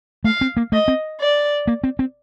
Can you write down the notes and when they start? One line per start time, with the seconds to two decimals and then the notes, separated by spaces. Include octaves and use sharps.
0.24 A3 F5
0.41 C4
0.57 A#3
0.72 A3 D#5
0.88 C4
1.20 D5
1.67 A#3
1.84 C4
1.99 C4